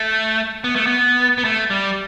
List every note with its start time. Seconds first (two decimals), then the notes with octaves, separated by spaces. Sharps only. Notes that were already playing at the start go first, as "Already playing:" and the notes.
Already playing: A3
0.64 B3
0.76 A3
0.86 B3
1.38 B3
1.44 A3
1.70 G3